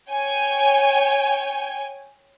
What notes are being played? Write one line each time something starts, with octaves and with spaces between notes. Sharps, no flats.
C#5 G5 G#5